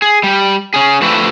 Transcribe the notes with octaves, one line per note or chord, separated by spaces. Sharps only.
G#4
G3
C#4 G#4
F3 A3 C4 D4 A4 B4